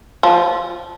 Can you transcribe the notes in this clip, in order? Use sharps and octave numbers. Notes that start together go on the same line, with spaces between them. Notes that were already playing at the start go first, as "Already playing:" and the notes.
F3